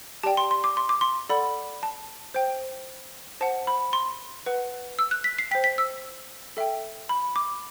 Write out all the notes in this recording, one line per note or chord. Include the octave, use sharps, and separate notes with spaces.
G4 D5 G5 A5
C6
C6
D6
C6
D6
C6
A4 D5 F#5 B5
A5
C5 G5
C5 F#5 A5
B5
C6
B4 F#5
E6
F#6
B6
C7
C5 G5 B6
B6
E6
A4 E5 G5
B5
D6